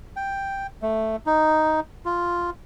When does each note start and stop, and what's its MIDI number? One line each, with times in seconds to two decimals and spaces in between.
0.16 0.67 79
0.82 1.16 57
1.26 1.80 63
2.05 2.50 65